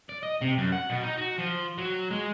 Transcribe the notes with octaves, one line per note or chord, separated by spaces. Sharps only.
D5
D#5
C3
F#2
F#5
B2
D#4
F#4
F3
F#3
G#3